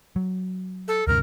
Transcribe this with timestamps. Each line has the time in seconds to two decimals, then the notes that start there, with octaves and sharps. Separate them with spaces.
0.16 F#3
0.88 A4
1.07 D2 G2 C3 A#4